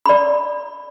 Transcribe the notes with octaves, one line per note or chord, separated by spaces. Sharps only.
D5 B5